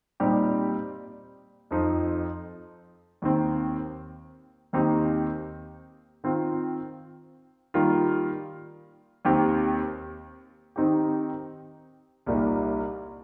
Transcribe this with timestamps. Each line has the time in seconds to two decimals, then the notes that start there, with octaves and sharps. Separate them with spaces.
0.20 A#2 G3 C4 D#4 G4
1.71 F2 F3 D#4
3.22 D#2 D#3 C4
4.73 D#2 D#3 C4 D#4 G4
6.24 D#3 C4 F4
7.74 D#3 G3 A#3 F4
9.25 D#2 D#3 C4 G4
10.76 D#3 C4 D#4 G4
12.26 C2 A#2 G3 A#3 D#4